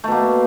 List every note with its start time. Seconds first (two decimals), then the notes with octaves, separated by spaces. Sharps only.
0.04 A3
0.08 B2
0.12 A#3